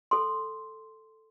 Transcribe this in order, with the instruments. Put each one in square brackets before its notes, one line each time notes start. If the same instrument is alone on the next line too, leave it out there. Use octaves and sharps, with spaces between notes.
[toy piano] A4 C6